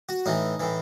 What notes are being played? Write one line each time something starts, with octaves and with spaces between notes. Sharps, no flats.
F#4
A2 E3 D#4
A2 E3